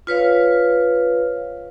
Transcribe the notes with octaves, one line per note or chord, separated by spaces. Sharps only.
F4 B4 C#5 F5